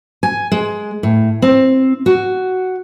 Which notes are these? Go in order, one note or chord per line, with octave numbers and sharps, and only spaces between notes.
G#5
G#3
A2
C4
F#4